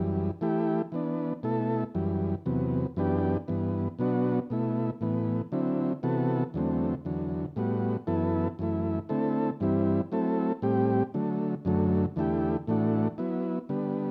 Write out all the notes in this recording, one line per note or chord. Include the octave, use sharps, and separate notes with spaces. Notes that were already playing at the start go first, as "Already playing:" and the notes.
Already playing: F#2 E3 G3
E3 A3 E4 G4
E3 B3 D4
B2 A3 E4 A4
F#2 E3 G3
E2 C3 F#3 B3
F#2 E3 B3 D4 G4
G2 E3 B3
B2 F#3 B3 D4 F#4
B2 A3 E4
A2 E3 B3
D3 F#3 C4 E4
C3 E3 B3 F#4 A4
E2 D3 F#3 A3 C4
E2 D3 F#3
A2 G3 B3 F#4
F#2 E3 B3 E4 A4
F#2 E3 A3 E4
D3 A3 C4 E4 A4
G2 E3 G3 C4 E4
F#3 A3 C4 E4 A4
A2 G3 C4 G4
D3 F#3 A3
F#2 D3 F#3 A3
E2 D3 A3 E4 G4
A2 E3 A3 D4 F#4
F#3 B3 E4
D3 G3 B3